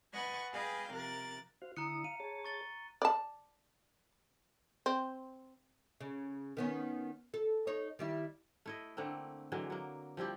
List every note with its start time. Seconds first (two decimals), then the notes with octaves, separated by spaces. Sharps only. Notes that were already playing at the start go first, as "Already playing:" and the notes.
0.14 B4 D#5 F#5 G#5 C#6 A6
0.53 G#4 B4 D#5 F5 G5 G#5
0.92 C3 F3 A#4 F#6 A6
1.62 F#4 C5 F5
1.77 D3 E4 A#5 D#6 F#6 C#7
2.04 F5 D#7
2.20 G#4 C#5 A5
2.44 C#6 A6 G7
3.02 D5 A5
4.86 C4
6.01 C#3
6.57 D#3 B3 C#4
7.34 A4
7.67 D#4 C#5
7.99 D#3 G3 E4
8.66 A3 E4 D#5
8.97 D3 A3 A#3 C4
9.52 D3 E3 F#3 G#3
9.70 F#3 A#3
10.17 F3 G3 E4 G4